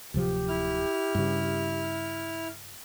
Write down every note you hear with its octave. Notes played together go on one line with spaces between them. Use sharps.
D1 C3 F3 G4
E4 F6
G2 C#3